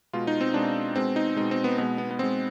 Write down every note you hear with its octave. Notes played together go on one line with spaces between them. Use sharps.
B2 G#3 F4
D#4
C4
B2 G#3 D4
B2 G#3 C4
D#4
B2 G#3 D#4
C4
B3
B2 G#3 B3
B3
B3
B2 G#3 C4